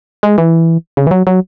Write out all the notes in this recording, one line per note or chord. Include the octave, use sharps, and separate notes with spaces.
G#3
E3
C#3
E3
F#3
F#3